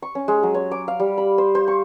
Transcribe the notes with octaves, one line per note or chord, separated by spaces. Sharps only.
C#6
C#4
G#3
F#3
C#5
D6
F5
G3
B5
C5
C5
C#6